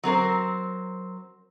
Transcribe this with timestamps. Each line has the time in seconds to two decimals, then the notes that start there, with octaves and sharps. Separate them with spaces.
0.03 F#3 C4 A#4 C5